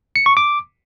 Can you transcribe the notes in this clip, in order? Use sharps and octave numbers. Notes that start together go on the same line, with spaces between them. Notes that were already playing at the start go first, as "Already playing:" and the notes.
C#7
C#6
D6